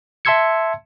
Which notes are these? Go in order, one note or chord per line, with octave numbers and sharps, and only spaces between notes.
E5 A5 C6 E6 G#6 C#7